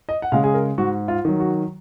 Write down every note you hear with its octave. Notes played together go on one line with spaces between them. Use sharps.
D#5
F#5
C#3 G#3 F5
G#4
A#4
G#2 F#4
F4
D#3 F#3
F#4